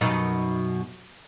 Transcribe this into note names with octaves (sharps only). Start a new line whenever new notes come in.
F#2 B2 D#4